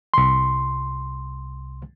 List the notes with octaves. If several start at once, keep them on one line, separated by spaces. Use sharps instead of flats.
C2 C6